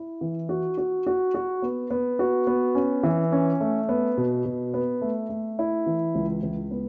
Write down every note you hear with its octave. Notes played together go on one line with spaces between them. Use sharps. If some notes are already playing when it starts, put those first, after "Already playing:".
Already playing: E4
E3
F#4
F#4
F#4
F#4
B3
B3
F#4
B3
C#4
E3
C#4
A3
B3
B2
B2
B3
A3
A3
E4
E3
C#2
C#2
B3